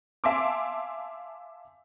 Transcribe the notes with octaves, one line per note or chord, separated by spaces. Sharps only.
E5 F5 G#5 A5 C6 D6